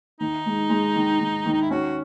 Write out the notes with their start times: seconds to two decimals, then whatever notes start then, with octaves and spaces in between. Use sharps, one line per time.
0.20 D#3 D#4
0.46 G#3
0.70 G#3
0.96 D#3
1.20 D#3
1.46 D#3
1.53 D#4
1.61 E4
1.71 C#4 F#4